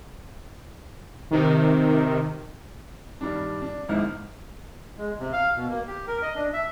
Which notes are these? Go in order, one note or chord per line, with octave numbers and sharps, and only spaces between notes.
C3 D#3
G2 D#3 G3 D4
D4
G#1 C#2 G#2 A#3 E4 F6
G#3
C3
F5
B2
A#3
G4
A#4
D#5
D4
E5